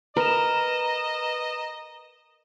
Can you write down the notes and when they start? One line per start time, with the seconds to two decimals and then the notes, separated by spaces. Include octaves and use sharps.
0.17 A#4 B4 D#5 A#5 E7